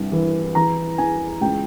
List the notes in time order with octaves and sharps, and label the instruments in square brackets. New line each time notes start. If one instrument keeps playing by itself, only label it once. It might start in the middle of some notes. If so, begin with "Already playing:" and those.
Already playing: [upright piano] C2 G2
E3
E3 A#5
E2 G#5
C#2 G5